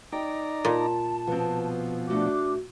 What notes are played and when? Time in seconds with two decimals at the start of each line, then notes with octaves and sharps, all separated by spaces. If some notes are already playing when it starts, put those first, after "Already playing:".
0.12 D#4 D5 G5 A#5
0.65 A#2 A5
1.27 B2 F3 B3 C4
2.08 A3 D4 F#4 D6